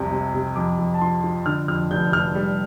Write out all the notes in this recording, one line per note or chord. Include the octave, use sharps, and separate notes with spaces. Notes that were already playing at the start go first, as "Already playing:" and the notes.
Already playing: C2 F2 C3
C3
C3
F2 D6
F2
A5
F3 C6
F3
D3 F6
F2 F6
F1 G6
F1 F6
G3